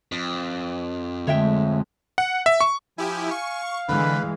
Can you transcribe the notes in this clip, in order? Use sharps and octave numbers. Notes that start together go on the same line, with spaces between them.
F2
D3 G#3 A3 C#5 E5 G5
F#5
E5
C#6
F3 E4 G4 G#5
F5 C#6
D3 E3 G#3 B4 B5